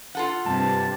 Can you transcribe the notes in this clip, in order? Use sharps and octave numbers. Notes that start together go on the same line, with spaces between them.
F4 A4 F#5
G2 C3 A5